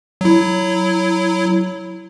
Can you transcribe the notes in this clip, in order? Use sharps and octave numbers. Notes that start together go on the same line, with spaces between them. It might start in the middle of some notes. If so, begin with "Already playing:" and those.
F#3 E4